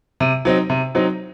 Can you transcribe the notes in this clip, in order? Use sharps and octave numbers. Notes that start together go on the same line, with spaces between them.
C3
F#3 C4 D#4
C3
F#3 C4 D#4